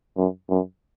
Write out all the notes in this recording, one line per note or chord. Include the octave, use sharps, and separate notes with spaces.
F#2
F#2